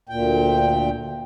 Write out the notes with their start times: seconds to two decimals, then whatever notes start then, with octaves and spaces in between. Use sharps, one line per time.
0.09 D2 A#2 G5